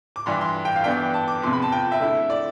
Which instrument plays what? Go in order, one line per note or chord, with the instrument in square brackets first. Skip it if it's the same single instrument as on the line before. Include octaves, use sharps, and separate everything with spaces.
[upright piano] D6
G2 E3 G3 C6
C6
G5
F5
G2 E3 B3 D4 G5
A5
D6
E2 C3 F3 C6
B5
A5
G5
E5
D3 A3 E4
D5